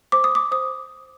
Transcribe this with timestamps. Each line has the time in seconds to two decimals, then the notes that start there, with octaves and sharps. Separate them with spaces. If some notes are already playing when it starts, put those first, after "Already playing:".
0.12 C5 D6
0.24 D#6
0.35 D6
0.52 C5 D#6